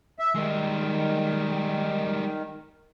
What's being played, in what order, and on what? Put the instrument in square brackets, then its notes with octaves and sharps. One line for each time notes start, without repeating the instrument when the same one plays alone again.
[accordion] E5
[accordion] D#3 [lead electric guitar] G3 G#3